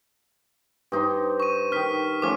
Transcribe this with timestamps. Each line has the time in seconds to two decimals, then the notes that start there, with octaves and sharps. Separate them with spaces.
0.92 G2 D#4 C5
1.40 C#6 D#7
1.72 D#3 D#4 F6 B6
2.22 F3 A3 C#4 D6 F6